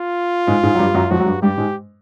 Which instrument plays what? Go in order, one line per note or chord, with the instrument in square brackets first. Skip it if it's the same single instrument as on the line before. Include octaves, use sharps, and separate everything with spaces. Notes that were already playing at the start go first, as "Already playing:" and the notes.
Already playing: [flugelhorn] F4
[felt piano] G#2 G#3
G#2 G#3
F#3
G2 G3
F#2 F#3
[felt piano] F2 F3 [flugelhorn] F#4
[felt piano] F#3
G2 G3
[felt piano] G2 G3 [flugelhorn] G4
[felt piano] G#2 G#3